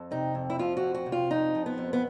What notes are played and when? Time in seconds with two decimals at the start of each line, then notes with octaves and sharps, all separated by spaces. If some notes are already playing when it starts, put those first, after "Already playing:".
Already playing: F2
0.11 C3 D#4
0.35 F2
0.50 E4
0.59 F3 F4
0.77 F#4
0.83 F2
0.94 F#4
1.06 C3
1.12 F4
1.30 F2 D#4
1.55 F3
1.66 B3
1.78 F2
1.93 B3